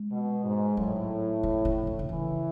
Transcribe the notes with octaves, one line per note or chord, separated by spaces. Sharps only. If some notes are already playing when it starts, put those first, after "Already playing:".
Already playing: G#3
B2
G#2
A2 F#3
E3
D3
D3
D3
C#3 E3